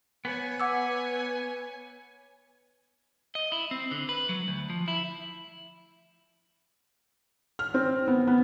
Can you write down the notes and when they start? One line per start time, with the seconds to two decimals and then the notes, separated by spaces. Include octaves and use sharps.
0.25 B3 B4 C#5 G#5
0.60 F#5 G#5 D6 E6
3.35 D#5
3.52 E4
3.71 C4
3.91 D3
4.09 B4
4.29 F#3
4.48 D2
4.70 F3
4.88 E4
7.59 F6
7.74 C4
8.08 B3
8.27 B3